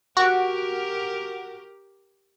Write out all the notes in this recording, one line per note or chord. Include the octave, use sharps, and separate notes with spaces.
F#4 G4 A#4